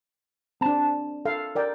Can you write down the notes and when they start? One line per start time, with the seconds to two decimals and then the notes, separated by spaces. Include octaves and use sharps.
0.61 C4 D4 A5
1.25 A4 F5
1.55 A#4 D5 G5